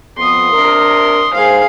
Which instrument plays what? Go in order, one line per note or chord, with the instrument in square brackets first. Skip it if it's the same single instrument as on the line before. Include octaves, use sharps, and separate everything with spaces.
[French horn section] F2 B3 [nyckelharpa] C6 D#6
[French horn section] C3 D4 A#4
[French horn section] G#2 C5 [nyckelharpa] G#4 F5